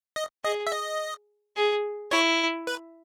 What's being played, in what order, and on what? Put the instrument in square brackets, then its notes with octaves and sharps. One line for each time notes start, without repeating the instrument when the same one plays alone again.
[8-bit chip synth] D#5
[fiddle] G#4 [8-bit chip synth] D#5
[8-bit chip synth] E5
D#5
[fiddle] G#4
[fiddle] E4 [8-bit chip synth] C#5
[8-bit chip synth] B4